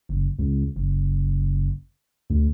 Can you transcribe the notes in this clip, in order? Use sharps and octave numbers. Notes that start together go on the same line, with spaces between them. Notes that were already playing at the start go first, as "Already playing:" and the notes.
F#1
C#2
F#1
D2